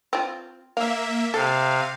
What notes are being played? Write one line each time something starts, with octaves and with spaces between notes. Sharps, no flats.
C4 F4
A#3 E5 F5
C3 A4 F5